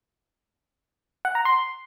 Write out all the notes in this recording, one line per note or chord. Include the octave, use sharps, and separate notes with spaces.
F#5
A#5
C6